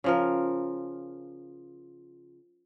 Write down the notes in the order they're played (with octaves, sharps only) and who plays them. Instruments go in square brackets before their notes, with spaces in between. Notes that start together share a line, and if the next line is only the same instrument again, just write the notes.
[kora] C#3 F3 A#4